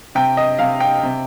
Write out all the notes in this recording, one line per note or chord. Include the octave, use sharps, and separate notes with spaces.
C3 G5
D#5
C3 F5
G5
C3